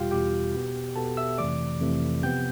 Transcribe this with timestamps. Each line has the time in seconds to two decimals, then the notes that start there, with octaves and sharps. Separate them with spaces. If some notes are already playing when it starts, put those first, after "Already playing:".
Already playing: E2 B2 G3 F4 G4 F5 G5
0.11 E2 B2 G3 G4 G5
0.53 B2 B3
0.96 B2 B3 A4 A5
1.17 E5 E6
1.38 F2 C3 E3 A3 D5 D6
1.80 F2 C3 E3 A3
2.23 C3 F3 B3 G5 G6